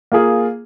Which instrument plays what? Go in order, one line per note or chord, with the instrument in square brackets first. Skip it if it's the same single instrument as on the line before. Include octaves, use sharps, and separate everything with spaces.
[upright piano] A#3 F4 G#4